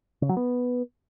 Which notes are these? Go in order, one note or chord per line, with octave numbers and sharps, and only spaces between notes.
C#3
F#3
B3